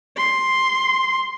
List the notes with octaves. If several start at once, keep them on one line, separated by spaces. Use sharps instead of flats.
C6